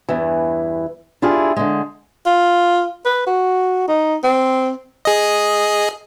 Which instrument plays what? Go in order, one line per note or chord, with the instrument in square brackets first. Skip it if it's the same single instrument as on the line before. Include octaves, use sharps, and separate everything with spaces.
[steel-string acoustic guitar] E2 G2 E3
D4 E4 F4 G4 G#4
D3 G#3
[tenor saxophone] F4
B4
F#4
D#4
C4
[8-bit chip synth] G#4 D#5